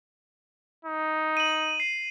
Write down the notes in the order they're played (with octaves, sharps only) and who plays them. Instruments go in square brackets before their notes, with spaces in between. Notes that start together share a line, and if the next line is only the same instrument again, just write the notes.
[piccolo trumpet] D#4
[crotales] D#7 F#7
C7